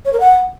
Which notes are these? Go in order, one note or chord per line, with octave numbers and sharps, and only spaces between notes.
C#5
A#4
F#5